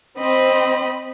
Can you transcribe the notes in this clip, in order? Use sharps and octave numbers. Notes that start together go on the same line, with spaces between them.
C4 D#5 B5